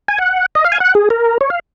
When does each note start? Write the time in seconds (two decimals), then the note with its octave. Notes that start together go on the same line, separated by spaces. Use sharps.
0.08 G#5
0.18 F#5
0.55 D#5
0.65 F5
0.72 G#5
0.80 F#5
0.95 G#4
1.10 A#4
1.41 C#5
1.50 F5